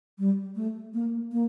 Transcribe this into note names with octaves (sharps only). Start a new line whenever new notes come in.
G3
A3
A#3
A#3